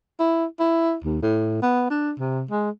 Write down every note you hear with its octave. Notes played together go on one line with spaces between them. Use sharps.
E4
E4
D#2
A2
B3
D4
C3
G#3